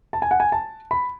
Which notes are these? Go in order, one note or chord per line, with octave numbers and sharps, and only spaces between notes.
A5
G#5
F#5
G#5
A5
B5